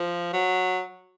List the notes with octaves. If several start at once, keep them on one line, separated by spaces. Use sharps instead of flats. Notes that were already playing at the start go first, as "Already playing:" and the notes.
Already playing: F3
F#3